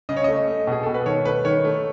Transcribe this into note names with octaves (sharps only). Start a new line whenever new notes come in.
C#3 D#5
C#5
A3 D#5
A3
B2 G#4
B2 A4
B4
D#3 C#5
A3 B4
D#3 C#5
A3